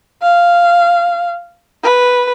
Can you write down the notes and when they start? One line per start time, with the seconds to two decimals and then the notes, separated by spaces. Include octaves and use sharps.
0.22 F5
1.83 B4